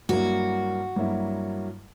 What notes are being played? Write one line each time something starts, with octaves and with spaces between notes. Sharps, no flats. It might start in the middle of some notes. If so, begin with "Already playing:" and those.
G2 F#3 A#3 E4 F#4
G2 F#3 A#3 E4